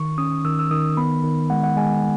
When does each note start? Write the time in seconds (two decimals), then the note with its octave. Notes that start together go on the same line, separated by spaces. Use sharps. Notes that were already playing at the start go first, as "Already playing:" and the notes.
Already playing: D#3 C#6
0.18 C#4 D#6
0.44 D#3 E6
0.59 E6
0.71 D#3 D#6
0.97 B3 B5
1.24 D#3
1.50 G#3 F#5
1.63 F#5
1.77 G#3 G#5